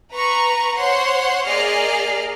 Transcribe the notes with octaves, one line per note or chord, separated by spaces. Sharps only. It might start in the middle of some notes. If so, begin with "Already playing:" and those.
B4 A#5 C#6
C5 C#5 F#5 C6
A#3 G#4 D5 D#5 F6 C7